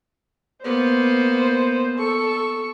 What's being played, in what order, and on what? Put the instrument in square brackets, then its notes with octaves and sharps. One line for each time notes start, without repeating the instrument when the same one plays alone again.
[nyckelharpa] A#3 B3 [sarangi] C5
[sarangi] A4 [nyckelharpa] C#6